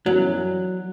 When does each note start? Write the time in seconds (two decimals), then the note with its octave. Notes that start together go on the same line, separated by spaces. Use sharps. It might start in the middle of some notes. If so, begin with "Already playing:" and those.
0.06 F#2 E3 F#3 B3 F#4 D5